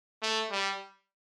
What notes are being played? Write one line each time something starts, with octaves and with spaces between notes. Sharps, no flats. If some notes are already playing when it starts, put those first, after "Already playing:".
A3
G3